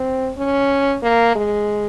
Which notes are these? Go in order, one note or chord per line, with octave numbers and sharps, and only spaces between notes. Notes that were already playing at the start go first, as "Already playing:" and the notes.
Already playing: C4
C#4
A#3
G#3